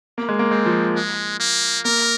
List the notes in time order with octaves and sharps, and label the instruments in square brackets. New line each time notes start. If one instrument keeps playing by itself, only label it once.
[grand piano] A#3
G#3
A#3
[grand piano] G#3 [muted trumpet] C4
[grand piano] F3
[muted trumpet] G#3
A#3
[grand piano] A#3 [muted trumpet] A#4